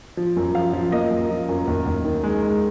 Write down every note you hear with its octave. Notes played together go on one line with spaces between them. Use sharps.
F3
F#2
F3 F5
F3
A#3 D#5
F#2
F3
F#2
D#2
D#2
D#3
G#3
G#3